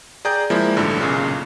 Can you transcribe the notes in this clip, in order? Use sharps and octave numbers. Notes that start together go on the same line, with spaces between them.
G#4 D5 G5 A#5 G6
F3 G#3 A#3 E4
A1 G2 D3
B1 A#2 C#3